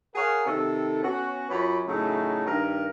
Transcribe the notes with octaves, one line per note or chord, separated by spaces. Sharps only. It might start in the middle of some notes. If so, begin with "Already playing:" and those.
G#4 A#4 C#5 F5 F#5
C3 D#3 A4
B3 C#4 F#4
F#2 F4 C#5 B5
A2 C#3 F#3 A3 D#4
G2 D#3 A#4